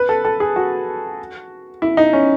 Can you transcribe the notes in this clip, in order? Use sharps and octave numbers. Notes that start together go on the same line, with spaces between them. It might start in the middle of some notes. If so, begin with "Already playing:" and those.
Already playing: B4
A4
A4
G#4
F#4
E4
D#4
C#4